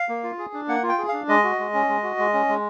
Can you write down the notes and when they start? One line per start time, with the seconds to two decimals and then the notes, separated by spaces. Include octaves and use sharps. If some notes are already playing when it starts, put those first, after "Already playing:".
Already playing: F5
0.09 A#3
0.23 F4
0.38 G#4
0.54 D4
0.68 A#3 F#5
0.83 F4
0.89 G5
0.98 G#4
1.09 D4 F5
1.28 G#3 D#5
1.44 F#4
1.59 G#3
1.74 C#4
1.89 G#3
2.03 F#4
2.19 G#3
2.33 C#4
2.49 G#3